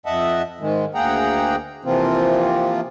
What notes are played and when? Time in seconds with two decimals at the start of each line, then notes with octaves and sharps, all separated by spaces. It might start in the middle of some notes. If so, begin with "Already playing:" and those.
0.06 F2 D#5 E5 F#5 A5
0.60 G#2 D#3 G#3
0.95 D2 A#3 G#4 F#5 G5 A#5
1.85 C3 E3 F3 A#3 C4 F4